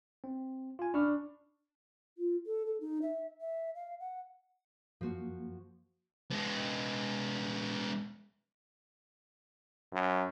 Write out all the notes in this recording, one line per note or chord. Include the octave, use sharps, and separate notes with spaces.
C4
F4 G#5
D4 B5 C#6 F6
F4
A4
A4
D#4
E5
E5
F5
F#5
F#2 F3 A#3 F#4
G#3 B3
F#2